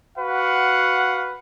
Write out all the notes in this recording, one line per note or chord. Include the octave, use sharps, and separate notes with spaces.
F#4 B4 F5 F#5